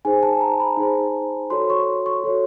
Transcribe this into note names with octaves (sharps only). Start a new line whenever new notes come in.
D#4 G#4 C5 G#5
A5
A#5
B5
D#4 G#4 C5
F#4 A4 C#5 C6
C#6
C#6
F#4 A4 C#5